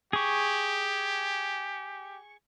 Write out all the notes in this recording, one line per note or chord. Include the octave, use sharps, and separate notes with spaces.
G4 G#4 C#6